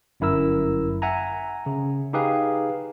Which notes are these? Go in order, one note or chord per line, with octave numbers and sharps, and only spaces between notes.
G1 F#2 E4 A#4 E6
E5 F#5 G#5 A#5
C#3
D#4 G4 G#4 B4 F5